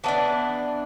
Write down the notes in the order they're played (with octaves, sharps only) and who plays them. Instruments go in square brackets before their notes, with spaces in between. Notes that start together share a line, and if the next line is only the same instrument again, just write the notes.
[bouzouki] E3 B3 D4 A5